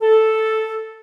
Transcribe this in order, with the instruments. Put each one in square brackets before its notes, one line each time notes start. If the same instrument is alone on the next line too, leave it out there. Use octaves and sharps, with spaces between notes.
[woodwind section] A4